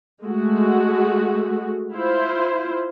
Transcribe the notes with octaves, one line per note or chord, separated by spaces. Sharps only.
G#3 A3 F#4
E4 F4 C5